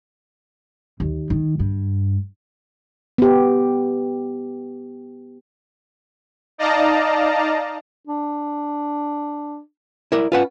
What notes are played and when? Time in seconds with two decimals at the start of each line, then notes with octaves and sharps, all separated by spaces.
1.00 D#2
1.30 D#3
1.59 G2
3.18 B3 G4
6.58 D#4 D5 D#5 F5 A5 A#5
8.07 D4
10.12 E4 A#4 D5
10.32 C#4 F4 B4 F#5